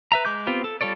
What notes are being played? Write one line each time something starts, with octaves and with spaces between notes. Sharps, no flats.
B4 E5 A#5
G#3 D6 G6
B3 C4 F4 G4
A4
G3 F4 A4 C#5 D5